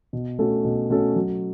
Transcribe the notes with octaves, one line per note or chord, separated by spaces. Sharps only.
B2
A3 C#4 F#4 A4
B2
A3 C#4 F#4 A4
F#3